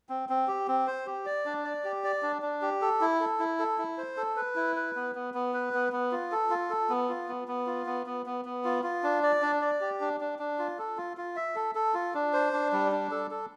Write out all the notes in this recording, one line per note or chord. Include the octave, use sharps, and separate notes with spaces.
C4
C4
G4
C4
C5
G4
D5
D4
D5
G4
D5
D4
D4
G4
A4
E4
A4
E4
A4
E4
C5
A4
B4
E4
B4
B3
B3
B3
B4
B3
B3
F4
A4
F4
A4
B3
F4
B3
B3
F4
B3
B3
B3
B3
F4
F4
D4
D5
D4
D5
G4
D4
D4
D4
F4
A4
F4
F4
E5
A4
A4
F4
D4
C5
D4
G3
D4
A4
A4